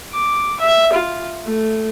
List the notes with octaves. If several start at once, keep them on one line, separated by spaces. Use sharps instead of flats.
D6
E5
F4
A3